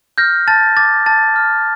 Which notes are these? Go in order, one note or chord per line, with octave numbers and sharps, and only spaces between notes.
F6 G6 A#6
A5 A6
D6 A6
A5 A6
F6